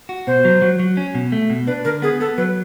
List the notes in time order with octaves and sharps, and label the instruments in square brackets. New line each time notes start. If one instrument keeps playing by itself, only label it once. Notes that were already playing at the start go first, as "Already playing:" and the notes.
[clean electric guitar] F#4
[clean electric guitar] B2 [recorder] C5
[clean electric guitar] F#3
F#3
F#3
C#4
B2
A3
B2
[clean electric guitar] D4 [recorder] B4
[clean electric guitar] D3 [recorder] A#4
[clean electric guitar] B3 [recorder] G#4
[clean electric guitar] B3 [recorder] A4
[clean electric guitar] F#3 [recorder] B4